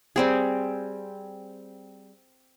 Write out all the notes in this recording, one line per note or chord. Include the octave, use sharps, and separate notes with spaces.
G3 C4 G#4